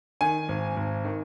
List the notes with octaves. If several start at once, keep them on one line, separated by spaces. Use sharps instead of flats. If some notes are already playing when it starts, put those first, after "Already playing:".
D#3 G#5
G#1
G#1
D#3